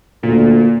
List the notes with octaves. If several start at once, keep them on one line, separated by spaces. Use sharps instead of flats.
D2 A#2